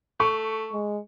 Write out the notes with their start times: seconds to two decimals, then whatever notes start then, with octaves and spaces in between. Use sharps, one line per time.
0.20 A3 C#6
0.73 G#3